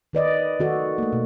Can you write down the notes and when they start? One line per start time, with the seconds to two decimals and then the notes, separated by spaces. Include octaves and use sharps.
0.13 D#3 B4 D5 D#5
0.60 D#3 F#4 A4
0.98 A3 A#3
1.13 B2